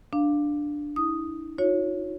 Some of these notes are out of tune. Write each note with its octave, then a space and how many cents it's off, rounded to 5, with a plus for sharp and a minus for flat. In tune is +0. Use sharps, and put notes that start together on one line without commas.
D4 +0 F5 +0
E4 -30 D#6 +0
D#4 +25 F#4 -45 C#5 +0